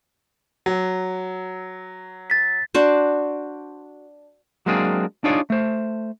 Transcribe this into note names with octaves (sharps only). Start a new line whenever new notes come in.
F#3
A6 B6
D4 F#4 C5
F#3 G#3 A#3 C4 D4 G#4
D4 D#4 F4 G#4 C#5 D5
A3 C5